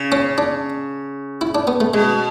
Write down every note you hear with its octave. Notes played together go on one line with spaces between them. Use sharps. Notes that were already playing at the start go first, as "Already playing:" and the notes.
Already playing: C#3
C#4
D4
E4
D4
B3
A3
B2 G#3